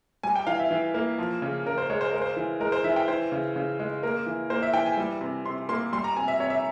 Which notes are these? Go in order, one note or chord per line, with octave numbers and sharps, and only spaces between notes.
G3 G#5
G5
E3 F5
E5
E3
A#3
F3
C#3
C#3 A#4
C5
G#3 C#5
C5
G#3 A#4
C5
E3
G#3 A#4
C5
E3 E5
G5
E3 C5
C#3
C#3
G#3
A#3 A#4
E3
A#3 C5
E5
E3 G5
G#5
G3
C3
C3 C6
A#3 C6
G3 C6
A#5
C3 G#5
E5
C3 C#5
E5